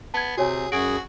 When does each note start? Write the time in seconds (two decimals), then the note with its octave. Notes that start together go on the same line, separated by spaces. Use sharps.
0.14 B3 A5 G#6
0.37 C3 F#4 G#4 C#5 G#5
0.72 F#2 F#4 G#4 D7